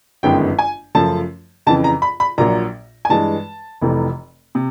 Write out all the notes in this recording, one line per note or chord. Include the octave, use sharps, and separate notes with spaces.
G1 F#2 D#3 G#3 B3 G5
G#5
F#2 C#3 F3 A3 A5
F2 C#3 E3 A5
A#5
B5
B5
A#1 A#2 F#3 A#5
G#5
G2 E3 G#3 A5
F1 F2 C3 E3 A3
C3